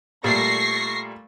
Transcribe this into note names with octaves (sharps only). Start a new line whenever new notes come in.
A#2 G3 A3 C#6 A#6 C7